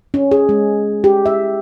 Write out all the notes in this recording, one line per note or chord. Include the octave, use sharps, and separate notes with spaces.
C#4
G#4
G#3
G4
E5